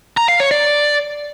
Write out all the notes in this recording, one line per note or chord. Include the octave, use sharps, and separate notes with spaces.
A#5
F5
C#5
D5